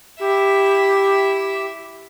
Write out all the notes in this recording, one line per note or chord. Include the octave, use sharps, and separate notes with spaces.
E4 G4 E5